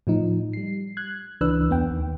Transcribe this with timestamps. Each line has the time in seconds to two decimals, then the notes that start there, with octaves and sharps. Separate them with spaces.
0.07 A2 F3 D#4
0.53 G3 C7
0.97 F#6 G#6
1.41 C#2 E3 D4 B4 E6 F#6
1.70 E2 B3 G5
1.91 D#2 D#3